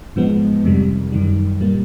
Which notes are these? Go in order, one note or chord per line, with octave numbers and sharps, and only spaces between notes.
G#2 F3 G#3 B3
F2 C3 D#3 G3
F#2 D#3 G3
A#2 G3 A#3